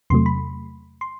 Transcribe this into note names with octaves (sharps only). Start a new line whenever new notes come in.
E2 C3 F#3 A3 C6
B5
C6